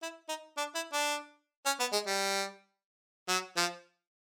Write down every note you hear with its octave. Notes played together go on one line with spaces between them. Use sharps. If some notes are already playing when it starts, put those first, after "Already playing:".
E4
D#4
D4
E4
D4
C#4
B3
G#3
G3
F#3
F3